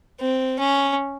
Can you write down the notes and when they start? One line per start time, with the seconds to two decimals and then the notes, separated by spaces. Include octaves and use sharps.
0.20 C4
0.59 C#4